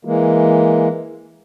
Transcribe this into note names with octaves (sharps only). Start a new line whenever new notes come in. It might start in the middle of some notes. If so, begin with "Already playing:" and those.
E3 G#3 A#3